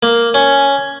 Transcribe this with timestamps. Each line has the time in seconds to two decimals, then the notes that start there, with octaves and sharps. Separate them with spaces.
0.03 A#3
0.34 C#4